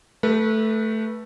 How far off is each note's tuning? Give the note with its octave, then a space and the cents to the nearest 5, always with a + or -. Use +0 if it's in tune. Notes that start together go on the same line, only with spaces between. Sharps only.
A3 +0 G4 +40 B4 -25